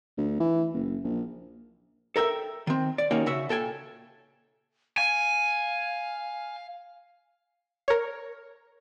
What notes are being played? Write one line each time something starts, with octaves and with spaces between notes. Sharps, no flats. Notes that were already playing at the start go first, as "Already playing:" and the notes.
D2
E3
F#1
A#1
A4 A#4 E5 G5
D#3 C4
D5
D#2 A#3 C#4 D#4 F#4 G5
C#3 F#4 E5
A#2 A4 G5 G#5
F5 G#5
A#4 C#5